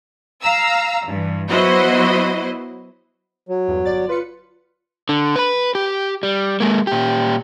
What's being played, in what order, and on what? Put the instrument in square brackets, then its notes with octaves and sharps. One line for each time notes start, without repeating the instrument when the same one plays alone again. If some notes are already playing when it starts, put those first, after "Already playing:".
[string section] F5 A#5 E6
G2 E3
F#3 B3 E4 F#4 C5 D#5
[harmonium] F#3
[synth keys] E2 G2
G1 D5 A6
[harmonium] F4 [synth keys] B4 C#7
[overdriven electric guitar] D3
B4 B5
G4
G3
G#3 A#3
A#2 G4